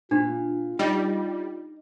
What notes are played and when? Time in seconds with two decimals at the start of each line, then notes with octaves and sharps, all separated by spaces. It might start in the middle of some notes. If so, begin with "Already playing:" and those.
0.11 A#2 D4 F4
0.79 G3 D#4 F4